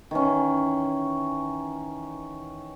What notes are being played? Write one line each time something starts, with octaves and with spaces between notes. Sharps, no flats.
D#3 E3 C#4